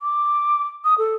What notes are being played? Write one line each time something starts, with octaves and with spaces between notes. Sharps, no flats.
D6
D#6
A4